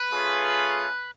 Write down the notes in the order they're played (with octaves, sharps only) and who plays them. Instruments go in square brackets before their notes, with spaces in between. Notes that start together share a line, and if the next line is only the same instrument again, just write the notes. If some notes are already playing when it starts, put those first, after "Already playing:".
Already playing: [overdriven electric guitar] B4
[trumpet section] A3 C#4 F4 G#4